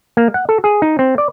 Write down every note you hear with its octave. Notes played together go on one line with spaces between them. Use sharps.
A#3
F#5
A4
G#4
D#4
C4
D5